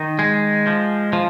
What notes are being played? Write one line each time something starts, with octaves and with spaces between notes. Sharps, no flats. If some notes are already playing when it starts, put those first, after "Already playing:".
Already playing: D#3 D#4
G#3
F3
F3